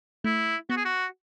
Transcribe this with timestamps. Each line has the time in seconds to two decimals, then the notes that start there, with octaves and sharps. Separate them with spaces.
0.24 A3 E4
0.70 B3 F#4
0.76 G#4
0.85 F#4